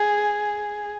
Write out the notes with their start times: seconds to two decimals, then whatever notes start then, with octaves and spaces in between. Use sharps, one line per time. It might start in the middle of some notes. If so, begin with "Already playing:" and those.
Already playing: G#4